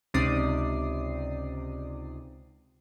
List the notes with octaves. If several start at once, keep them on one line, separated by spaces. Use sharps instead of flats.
C#2 C3 D#4 D5 D#6 C7